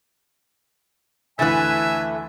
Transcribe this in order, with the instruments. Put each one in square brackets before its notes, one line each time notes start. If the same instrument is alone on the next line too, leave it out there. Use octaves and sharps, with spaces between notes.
[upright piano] D2 E3 A6 [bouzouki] A3 B4 [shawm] E5 [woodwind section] G#5